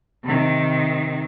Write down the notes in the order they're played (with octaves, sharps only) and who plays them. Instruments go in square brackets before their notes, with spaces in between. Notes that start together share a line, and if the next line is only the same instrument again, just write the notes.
[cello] C3 D#3